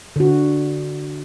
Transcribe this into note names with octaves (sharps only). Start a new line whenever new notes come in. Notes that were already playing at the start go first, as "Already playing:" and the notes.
D3 F#4